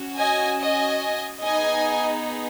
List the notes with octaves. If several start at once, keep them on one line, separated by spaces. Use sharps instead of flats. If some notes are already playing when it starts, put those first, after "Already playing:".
Already playing: C#4 F#4
D#5 G#5
D#5 G#5
B3 D#4 G#4 D#5 G#5